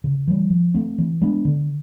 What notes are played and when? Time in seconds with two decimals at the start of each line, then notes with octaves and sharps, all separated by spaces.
0.04 C#3
0.28 E3 G3
0.50 F3
0.74 A3 C4
0.98 E3
1.21 G#3 B3 D4
1.45 D3